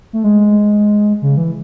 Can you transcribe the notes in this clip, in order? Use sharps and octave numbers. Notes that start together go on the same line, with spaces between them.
A3
G#3
C#3
E3